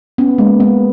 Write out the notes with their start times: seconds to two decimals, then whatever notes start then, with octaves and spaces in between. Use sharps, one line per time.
0.18 B3 C#4
0.38 G#3 A#3
0.60 G#3 B3